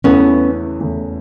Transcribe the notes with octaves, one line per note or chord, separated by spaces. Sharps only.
E2 C#3 E3 A3 B3 C#4
E2 C#3 E3 A3